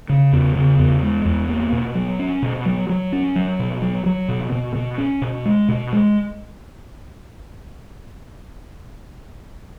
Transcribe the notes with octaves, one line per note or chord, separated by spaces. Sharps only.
C#3
E2
C#3
E2
G#3
E2
A#3
B2
F#3
C#4
B2
F#3
F#3
C#4
F#3
B2
F#3
F#3
B2
B2
B2
C#4
B2
G#3
B2
G#3